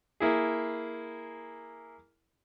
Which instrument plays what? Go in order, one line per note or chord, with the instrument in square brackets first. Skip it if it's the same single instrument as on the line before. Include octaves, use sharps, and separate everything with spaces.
[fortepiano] A#3 E4 G#4